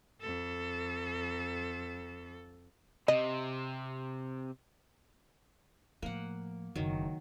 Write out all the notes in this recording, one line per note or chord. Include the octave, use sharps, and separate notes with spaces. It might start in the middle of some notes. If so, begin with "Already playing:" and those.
F2 A4
C3 D#5
A2 F3 A#3 F#5
F#1 E2 D#3 F#3